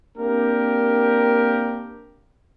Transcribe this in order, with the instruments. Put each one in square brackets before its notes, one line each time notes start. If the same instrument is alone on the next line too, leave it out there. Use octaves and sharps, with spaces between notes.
[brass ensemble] A#3 C4 D4 G4 A#4